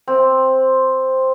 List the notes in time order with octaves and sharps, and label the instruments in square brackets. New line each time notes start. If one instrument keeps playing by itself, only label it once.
[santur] C4